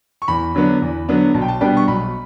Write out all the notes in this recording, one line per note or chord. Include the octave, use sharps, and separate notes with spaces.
C#6
E2 B5
D3 F#3 B3 D4
E2
D3 F#3 B3 D4
B1 A5
G5
A5
B2 G3 B3 D4 G5
C#6
B1 B5